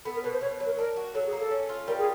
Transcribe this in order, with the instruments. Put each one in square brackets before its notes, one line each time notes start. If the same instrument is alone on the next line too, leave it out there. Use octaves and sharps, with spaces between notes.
[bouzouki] B3 [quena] A4
[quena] A#4
[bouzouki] B2 [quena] B4
[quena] C5
[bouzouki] B2 [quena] C#5
[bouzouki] F#3
[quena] A#4
[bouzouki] D4 [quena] A#4
[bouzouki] F#4
[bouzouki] F#3 [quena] A4
[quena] G#4
[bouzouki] A#3
[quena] A4
[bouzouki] C#4
F4
[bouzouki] G3 [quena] A#4
[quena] G#4